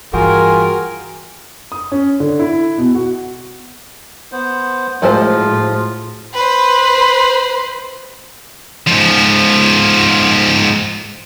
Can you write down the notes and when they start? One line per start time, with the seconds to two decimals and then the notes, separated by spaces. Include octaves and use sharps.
0.14 G2 E3 F4 F#4 G#4 A#4 G5 G#5
1.72 D#6
1.92 C#4
2.20 D3
2.39 E4
2.78 B2
2.94 F#4
4.32 B3 C5
5.02 A2 F3 F#3 G#3 F4 C5
6.33 B4 C5
8.87 G#2 F3